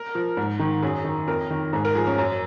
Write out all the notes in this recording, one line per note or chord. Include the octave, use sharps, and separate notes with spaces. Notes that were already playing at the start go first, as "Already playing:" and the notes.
Already playing: A#4
F3
G#2
D#3
F#2 G#4
D#3
F2 A#4
D#3
G#2 G#4
A#4
F3 G#4
C#4
F#2